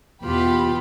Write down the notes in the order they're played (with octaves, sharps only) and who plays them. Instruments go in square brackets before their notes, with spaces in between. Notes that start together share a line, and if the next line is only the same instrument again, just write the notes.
[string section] E2 B2 B3 F4 G4 B5